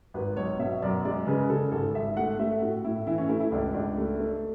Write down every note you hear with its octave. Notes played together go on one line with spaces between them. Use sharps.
G#1 B4
B1 C#5
B2 E5
F#2 D5
G#3 D5
C#3 B4
C#3 A4
G#1 A4
G#1 E5
A3 F#5
A3 E5
A2 F#4
A2 E4
E3 E4
C#4
A3 E4
E4
C#2 D4
C#2 D4
A3
A3